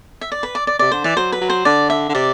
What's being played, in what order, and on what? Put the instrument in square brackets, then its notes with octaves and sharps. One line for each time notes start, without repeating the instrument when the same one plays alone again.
[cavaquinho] E5
D5
B4
D5
D5
[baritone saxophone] C3 [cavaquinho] D5
[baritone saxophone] D3 [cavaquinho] C5
[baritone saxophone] E3 [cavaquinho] D5
[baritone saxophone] F#3 [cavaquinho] C5
[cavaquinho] B4
[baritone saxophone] F#3
[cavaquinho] C5
[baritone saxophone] D3 [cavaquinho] D5
[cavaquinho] E5
[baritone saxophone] D3
[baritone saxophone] C3 [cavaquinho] D5